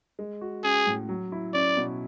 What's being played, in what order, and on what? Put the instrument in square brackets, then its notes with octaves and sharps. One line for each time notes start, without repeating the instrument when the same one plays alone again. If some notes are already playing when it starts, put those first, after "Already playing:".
[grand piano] G#3
F#4
[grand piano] C#4 [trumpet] G#4
[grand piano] A2
F#3
E4
[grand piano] C#4 [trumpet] D5
[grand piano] B2